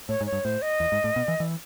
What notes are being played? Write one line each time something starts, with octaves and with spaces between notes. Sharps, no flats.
A2 C#5
G#2
C#5
G2
A2 C5
D#5
E2
G#2
A2
B2
E3
E3